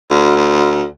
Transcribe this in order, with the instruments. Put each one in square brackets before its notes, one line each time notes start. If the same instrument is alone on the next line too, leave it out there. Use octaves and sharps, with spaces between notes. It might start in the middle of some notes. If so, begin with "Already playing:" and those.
[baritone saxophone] D2